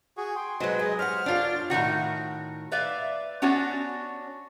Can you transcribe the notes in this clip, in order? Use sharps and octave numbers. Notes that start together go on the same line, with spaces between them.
F#4 G#4
G5 C6
F#3 G#3 B4 C5 D#5
G#4 D#5
G4 C5 C#5 F#5 F6
F#2 D4 F4
A2 C3 D#3 F#4
B4 D5 E5 F5
B3 C#4 D4 F#4 C#5